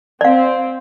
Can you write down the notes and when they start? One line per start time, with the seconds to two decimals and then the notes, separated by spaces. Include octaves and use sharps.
0.21 C4 D5 F5